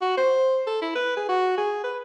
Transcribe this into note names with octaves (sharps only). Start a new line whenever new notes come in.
F#4
C5
A4
E4
B4
G#4
F#4
G#4
B4